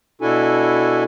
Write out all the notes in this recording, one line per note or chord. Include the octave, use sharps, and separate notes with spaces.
B2 D4 E4 F#4 A4 G#5